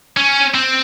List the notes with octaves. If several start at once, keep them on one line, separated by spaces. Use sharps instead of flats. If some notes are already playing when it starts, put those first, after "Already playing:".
C#4
C4